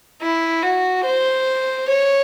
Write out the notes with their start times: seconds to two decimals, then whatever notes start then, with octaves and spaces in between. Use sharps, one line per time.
0.22 E4
0.63 F#4
1.06 C5
1.88 C#5